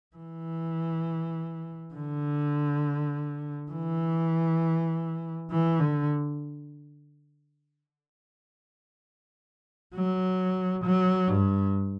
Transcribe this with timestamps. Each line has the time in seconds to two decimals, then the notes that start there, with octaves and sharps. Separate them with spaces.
0.16 E3
1.94 D3
3.72 E3
5.51 E3
5.80 D3
9.95 F#3
10.85 F#3
11.28 G2